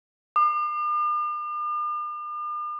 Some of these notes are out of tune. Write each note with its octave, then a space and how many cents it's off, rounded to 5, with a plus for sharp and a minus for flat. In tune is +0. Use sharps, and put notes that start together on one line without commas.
D6 +45